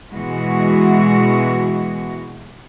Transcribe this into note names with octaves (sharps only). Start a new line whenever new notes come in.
B2 E3 G#3 F#4